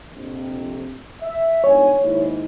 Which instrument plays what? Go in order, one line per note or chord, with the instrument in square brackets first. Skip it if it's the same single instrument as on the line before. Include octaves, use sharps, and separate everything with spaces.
[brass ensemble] A#1 F2 C3
E5
[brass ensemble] G1 G#2 G#5 [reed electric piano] C#5
[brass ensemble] D#2 G#2 E4